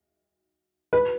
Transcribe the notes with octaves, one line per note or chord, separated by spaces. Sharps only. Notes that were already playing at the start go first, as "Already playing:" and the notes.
B4